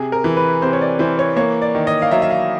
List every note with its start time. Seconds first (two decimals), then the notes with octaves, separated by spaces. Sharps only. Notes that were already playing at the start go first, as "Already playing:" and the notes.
Already playing: C3 G#4
0.12 A#4
0.24 E3
0.37 B4
0.62 C3 C5
0.73 C#5
0.82 D5
0.99 E3 C5
1.19 C#5
1.36 A#3 C#5
1.62 D5
1.75 D#3
1.87 D#5
2.02 F5
2.11 F#3 E5
2.22 E5
2.31 F5